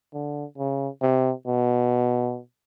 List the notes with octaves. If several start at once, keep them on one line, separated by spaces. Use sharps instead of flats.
D3
C#3
C3
B2